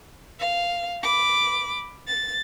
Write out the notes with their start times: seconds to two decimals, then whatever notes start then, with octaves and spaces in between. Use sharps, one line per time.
0.40 F5
1.03 B5 D6
2.08 A6